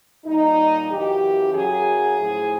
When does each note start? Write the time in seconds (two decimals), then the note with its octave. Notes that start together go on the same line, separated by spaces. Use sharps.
0.24 A#2 G3 D#4
0.89 F#2 C#3 E3 G4
1.54 F#2 C#3 F#3 G#4
2.18 A2 F3